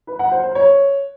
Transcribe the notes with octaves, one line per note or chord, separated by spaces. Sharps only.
B4
F#5
C5
C5
C#5